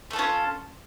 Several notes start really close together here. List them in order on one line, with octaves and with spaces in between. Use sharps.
A3 A4 F4 C#4